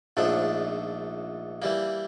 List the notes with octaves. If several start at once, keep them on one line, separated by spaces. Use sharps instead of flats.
A#1 G#2 F3 A3 D4
E3 G3 A#3